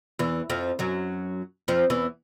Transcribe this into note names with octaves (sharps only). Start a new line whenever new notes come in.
E2 E3
F2 F3
F#2 F#3
F2 F3
E2 E3